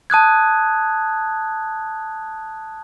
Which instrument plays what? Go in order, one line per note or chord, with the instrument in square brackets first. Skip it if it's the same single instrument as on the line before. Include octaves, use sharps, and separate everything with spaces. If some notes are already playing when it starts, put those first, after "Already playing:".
[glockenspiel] A5 D#6 F#6 G#6